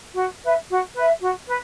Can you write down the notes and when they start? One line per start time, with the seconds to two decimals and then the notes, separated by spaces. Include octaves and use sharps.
0.15 F#4
0.42 B4 E5
0.68 F#4
0.95 B4 E5
1.21 F#4
1.47 B4